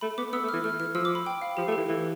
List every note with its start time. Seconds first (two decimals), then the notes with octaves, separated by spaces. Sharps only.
0.01 A3 B5
0.18 B3 D6
0.33 B3 E6
0.43 A3
0.49 F6
0.53 E3
0.64 A3 F6
0.79 E3 F6
0.95 F3 E6
1.05 D6
1.15 B5
1.26 G5
1.42 F5
1.57 F3 G4
1.68 A3
1.72 G4
1.77 E3
1.89 E3 A4